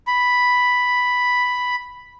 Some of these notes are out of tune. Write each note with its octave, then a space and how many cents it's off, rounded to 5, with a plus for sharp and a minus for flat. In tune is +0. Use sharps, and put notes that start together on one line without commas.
B5 +0